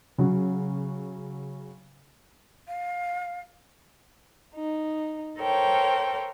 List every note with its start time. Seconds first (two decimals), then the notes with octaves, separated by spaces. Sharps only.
0.18 C#3 F#3
2.68 F5
4.55 D#4
5.40 A4 A#4 C5 C#5 G5